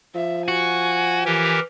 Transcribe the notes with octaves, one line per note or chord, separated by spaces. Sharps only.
F3 E5
F#4 G#5
E3 G4 A#4